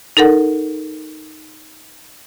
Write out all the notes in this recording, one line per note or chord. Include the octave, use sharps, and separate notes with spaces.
D#4 A4 A#4 F#5